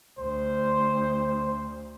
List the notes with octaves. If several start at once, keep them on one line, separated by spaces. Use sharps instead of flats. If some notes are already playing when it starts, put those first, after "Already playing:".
D2 C5